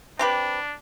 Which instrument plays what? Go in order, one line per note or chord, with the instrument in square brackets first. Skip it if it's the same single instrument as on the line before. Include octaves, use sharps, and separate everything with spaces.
[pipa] C4 G4 B4 [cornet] D4